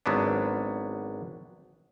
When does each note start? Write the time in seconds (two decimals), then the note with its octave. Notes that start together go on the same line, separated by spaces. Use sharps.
0.06 G#1 F#3 B3 D4